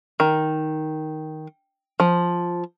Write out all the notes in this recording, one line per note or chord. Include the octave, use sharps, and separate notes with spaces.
D#3
F3